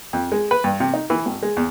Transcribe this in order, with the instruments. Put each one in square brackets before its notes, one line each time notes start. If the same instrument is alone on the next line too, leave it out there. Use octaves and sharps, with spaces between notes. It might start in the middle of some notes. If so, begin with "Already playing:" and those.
[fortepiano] F2
G#3
B4
G2
C3
D#4
E3
G#1
G#3
E2